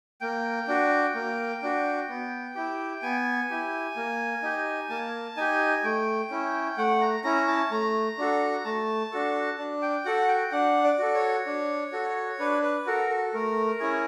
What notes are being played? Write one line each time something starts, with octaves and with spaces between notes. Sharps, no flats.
A#3 G5
D4 F#4
A#3
D4 F#4
B3
E4 G4
B3 G#5
E4 G4
A#3
D#4 G4
A#3 A5
D#4 G4 G#5
A3 G5
C#4 E4
A3 F#5
A#5
C#4 E4 A#5
A5
A3 A#5
D4 F#4 A4
A3 A5
D4 F#4 A4
D4
G5
F#4 A4 F#5
G5
D4 F#5
D5
F#4 A4
C#5
D4
F#4 A4
D4 B4
B4
F#4 A4 A#4
A4
A3 A#4
C#4 E4 G#4